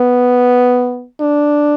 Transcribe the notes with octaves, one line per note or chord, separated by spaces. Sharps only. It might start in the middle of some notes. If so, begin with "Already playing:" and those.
Already playing: B3
D4